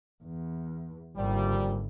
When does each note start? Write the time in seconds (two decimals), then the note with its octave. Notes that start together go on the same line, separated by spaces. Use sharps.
0.24 E2
1.17 G#1 A#2 D3 F3 G3